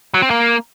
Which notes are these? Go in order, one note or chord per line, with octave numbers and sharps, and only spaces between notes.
F#3
C4
A#3